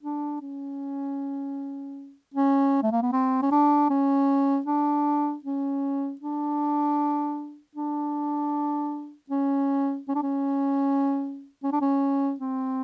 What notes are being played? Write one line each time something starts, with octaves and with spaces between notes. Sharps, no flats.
D4
C#4
C#4
A3
A#3
B3
C4
C#4
D4
C#4
D4
C#4
D4
D4
C#4
C#4
D4
C#4
C#4
D4
C#4
C4